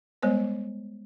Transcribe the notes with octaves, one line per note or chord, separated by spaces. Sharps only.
G3 G#3 B3 C5 C#5